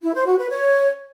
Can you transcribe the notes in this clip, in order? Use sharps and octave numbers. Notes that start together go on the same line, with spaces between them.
E4
C5
F#4
B4
C#5